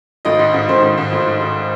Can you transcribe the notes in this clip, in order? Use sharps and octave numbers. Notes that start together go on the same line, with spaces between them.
G#1 D#5
G#2
G#2
D#3 C5
G#2
G#2
G#1
G#1
G#2